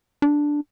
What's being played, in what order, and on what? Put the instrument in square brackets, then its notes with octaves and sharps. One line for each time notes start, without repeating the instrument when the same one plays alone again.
[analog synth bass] D4